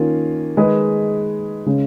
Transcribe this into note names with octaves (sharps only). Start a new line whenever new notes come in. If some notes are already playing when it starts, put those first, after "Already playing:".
Already playing: D#3 A#3 C#4 F4
D#3 G#3 D#4 G#4 B4
C#3 G#3 C#4